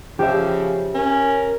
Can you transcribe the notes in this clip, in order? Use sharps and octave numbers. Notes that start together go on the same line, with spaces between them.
C#3 F3 G4 E5
C#4 A#4